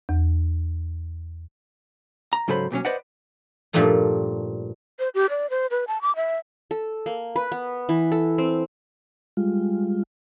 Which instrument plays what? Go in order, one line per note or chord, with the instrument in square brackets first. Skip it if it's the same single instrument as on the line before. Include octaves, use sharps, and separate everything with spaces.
[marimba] E2
[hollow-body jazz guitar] A#5
G#2 C#3 F#3 A4 C5 B5
B1 A#2 F#3 C#4
B4 C5 D5 D#5 F#5
[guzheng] G2 A#2 F3 G3 A3 D#4
[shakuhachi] C5
G4
D5
C5
B4
A5
D6
E5
[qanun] A4
A#3
B4
B3
E3
A4
C4
[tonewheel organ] G3 G#3 F4